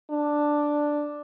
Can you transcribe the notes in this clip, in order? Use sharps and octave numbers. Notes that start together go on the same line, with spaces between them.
D4